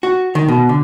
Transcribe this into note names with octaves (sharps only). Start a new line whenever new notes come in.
F#4
D#3
B2
D3